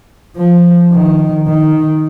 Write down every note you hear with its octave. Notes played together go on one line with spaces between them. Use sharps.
F3
D#3
D#3